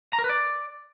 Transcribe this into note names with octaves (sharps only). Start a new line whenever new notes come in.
A#5
A#4
B4
D5